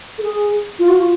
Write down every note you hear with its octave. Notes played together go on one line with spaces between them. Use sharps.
A4
G#4
F4
F#4
F4